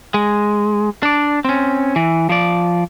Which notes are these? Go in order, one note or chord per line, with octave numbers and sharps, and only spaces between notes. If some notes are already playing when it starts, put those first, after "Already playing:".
G#3
D4 D5
C4 C#4
E3
F3 D5